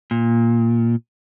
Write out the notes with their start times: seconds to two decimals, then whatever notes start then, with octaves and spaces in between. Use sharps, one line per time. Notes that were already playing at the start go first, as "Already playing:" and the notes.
0.11 A#2